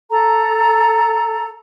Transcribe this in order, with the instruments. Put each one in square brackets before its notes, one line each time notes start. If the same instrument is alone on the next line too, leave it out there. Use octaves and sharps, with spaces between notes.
[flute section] A4 A#5